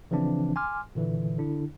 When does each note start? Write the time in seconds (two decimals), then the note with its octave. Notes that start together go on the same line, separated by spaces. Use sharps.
0.11 C#3 E3 F3 C4 D4
0.56 G#5 C6 D6 F6
0.95 A#2 D3 E3
1.38 D3 D4 E4